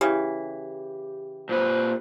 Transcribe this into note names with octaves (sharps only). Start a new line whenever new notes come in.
C#3 E3 G4
A#2 B4 C5